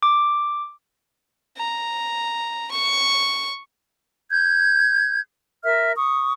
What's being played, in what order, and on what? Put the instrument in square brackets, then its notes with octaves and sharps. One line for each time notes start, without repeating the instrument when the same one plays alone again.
[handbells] D6
[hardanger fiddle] A#5
C#6
[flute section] G6 G#6
A#4 E5 F6
C#6 D#6